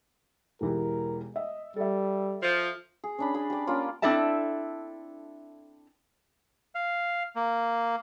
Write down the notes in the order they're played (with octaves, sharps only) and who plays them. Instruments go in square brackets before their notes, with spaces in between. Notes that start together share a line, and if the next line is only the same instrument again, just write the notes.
[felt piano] E1 E3 G4 [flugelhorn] A#4
[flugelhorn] D#5 [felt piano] E5
[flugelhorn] G3 [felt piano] A4 E5
[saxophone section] F3
[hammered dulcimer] G#4
C#4 D4 B5
G#4 B5
G4 D5
A#3 C#4 F4 D5
[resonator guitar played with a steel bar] C4 D4 E4 A4 E5 A5
[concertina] F5
A#3